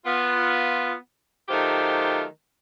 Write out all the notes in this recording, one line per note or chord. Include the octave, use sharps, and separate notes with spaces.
B3 F4
D#3 F#3 A3 F4 G4 C5